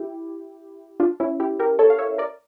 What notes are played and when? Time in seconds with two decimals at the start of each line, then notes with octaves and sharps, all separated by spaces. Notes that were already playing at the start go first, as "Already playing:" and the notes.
Already playing: E4 G4
1.00 D4 F4
1.20 C#4 E4
1.40 E4 G4
1.59 G4 A#4
1.79 A4 C#5
1.90 F5
1.99 C#5 E5
2.18 A#4 D5